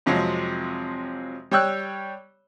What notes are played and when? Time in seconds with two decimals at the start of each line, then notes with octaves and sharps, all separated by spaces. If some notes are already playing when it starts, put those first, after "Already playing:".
0.06 F2 C3 F3 F#3 G#3
1.51 G3 C#5 G5 E6 F#6